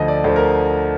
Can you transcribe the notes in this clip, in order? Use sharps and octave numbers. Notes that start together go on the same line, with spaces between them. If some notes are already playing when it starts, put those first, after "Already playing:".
Already playing: D2 D3 F3 D#5
D5
D2 D3 F3 C5
A#4